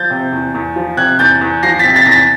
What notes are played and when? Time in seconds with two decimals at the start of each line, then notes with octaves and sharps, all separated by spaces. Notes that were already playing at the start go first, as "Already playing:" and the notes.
Already playing: F3 G6 A6
0.10 C3
0.32 E2
0.54 E2
0.76 F3
0.97 C3 F#6 G#6
1.19 E2 G6 A6
1.41 E2
1.63 F3 A#6 C7
1.79 C3 A6 B6
1.96 A6 B6
2.06 E2 A#6
2.12 A6 B6